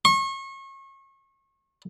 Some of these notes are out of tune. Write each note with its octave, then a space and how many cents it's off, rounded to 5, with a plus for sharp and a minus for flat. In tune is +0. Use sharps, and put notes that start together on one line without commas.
C#6 -35